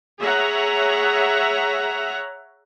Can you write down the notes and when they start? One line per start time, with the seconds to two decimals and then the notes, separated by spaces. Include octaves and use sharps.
0.21 G#4 C#5 E5 F#5 A#5